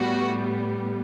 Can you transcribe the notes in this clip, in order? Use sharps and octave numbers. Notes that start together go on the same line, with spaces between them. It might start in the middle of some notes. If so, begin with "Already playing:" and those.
Already playing: A2 G3 B3 F#4